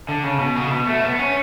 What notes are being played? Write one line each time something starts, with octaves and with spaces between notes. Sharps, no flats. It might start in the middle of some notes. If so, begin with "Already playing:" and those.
D3
C#3
B2
C#3
B2
A3
B3
B3
C#4